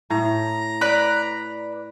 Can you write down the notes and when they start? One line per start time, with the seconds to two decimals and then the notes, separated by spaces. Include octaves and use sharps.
0.10 A2 A#5
0.81 B4 D5